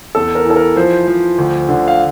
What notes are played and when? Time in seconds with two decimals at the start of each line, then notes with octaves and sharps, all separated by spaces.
0.15 E2 A4
0.35 A#4
0.45 E3 A4
0.56 A#4
0.76 F3 C5
1.07 F3
1.38 D2
1.69 D3
1.88 F5